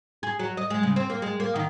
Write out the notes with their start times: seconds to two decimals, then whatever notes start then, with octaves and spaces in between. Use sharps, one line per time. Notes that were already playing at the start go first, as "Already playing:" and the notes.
0.23 G#4
0.39 F#3
0.57 D#5
0.70 G#3
0.83 C#3
0.96 C4
1.10 A#3
1.22 G#3
1.40 A#3
1.56 D#3